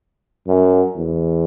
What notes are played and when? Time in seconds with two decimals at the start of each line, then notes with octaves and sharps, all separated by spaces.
0.47 F#2
0.96 E2